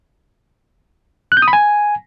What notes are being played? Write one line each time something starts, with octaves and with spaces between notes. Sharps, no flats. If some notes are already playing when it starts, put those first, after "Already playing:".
F#6
G6
D#6
B5
G#5